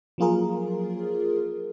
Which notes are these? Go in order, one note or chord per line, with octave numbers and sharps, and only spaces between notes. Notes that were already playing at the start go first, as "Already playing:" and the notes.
F3 F#3 A#3 F4 G#4 A#4